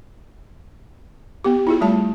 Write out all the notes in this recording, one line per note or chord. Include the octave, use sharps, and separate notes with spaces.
B3 G4
E4 F4 G#4
G3 A3 A5